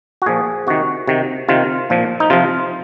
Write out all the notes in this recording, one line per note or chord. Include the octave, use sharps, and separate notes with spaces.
F#4
A#2 F3 G#4
C3 D#3 F#4
C3 D#3
C3 D#3 F4
A#2 F3
D#4
C3 F3 F4